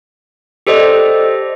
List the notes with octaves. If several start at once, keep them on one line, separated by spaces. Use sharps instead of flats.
G4 A4 C5 D5 D#5